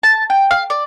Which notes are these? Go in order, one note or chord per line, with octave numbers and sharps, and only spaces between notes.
A5
G5
F5
D5